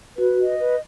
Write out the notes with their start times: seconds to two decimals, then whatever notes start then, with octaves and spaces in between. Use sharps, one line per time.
0.18 F#4 B4
0.39 D#5
0.59 B4